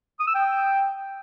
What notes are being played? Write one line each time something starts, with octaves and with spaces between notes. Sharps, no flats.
D#6
E6
G5